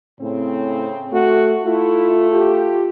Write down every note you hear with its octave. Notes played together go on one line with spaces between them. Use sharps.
A2 C#3 C4
A3 F#4
A3 E4 F4
F4 G4